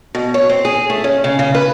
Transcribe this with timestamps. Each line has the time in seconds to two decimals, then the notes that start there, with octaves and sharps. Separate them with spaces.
0.15 B2
0.34 C#5
0.49 C4
0.65 G#4
0.90 A3
1.04 C#4
1.24 C#3
1.39 C#3
1.55 B4